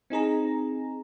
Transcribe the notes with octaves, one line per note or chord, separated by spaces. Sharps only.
C4 D#4 G#4 A#5